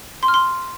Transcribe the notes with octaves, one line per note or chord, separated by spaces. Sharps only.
C6
F6
C6